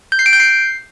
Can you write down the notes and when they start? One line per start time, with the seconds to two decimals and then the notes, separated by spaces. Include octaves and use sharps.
0.12 G6
0.19 C7
0.26 D7
0.33 G6
0.40 C7